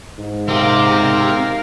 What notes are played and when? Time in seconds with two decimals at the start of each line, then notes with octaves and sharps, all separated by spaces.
0.18 G#2
0.48 C4 G4 A#4 F5